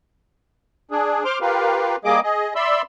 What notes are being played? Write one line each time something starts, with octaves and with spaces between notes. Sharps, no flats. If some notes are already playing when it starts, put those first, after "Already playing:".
D4 G#4
C5 C6 D6 F6
F4 G4 A#4 B4 F5
G3 A#3 G#4 D#5 D6
G#4 D#5
D5 E5 B5 C6 E6